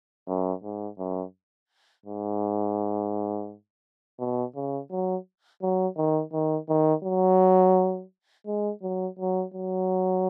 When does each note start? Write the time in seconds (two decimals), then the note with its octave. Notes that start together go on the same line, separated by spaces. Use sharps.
0.28 F#2
0.63 G#2
0.98 F#2
2.06 G#2
4.19 B2
4.55 C#3
4.91 F#3
5.62 F#3
5.97 D#3
6.33 D#3
6.69 D#3
7.04 F#3
8.47 G#3
8.82 F#3
9.19 F#3
9.54 F#3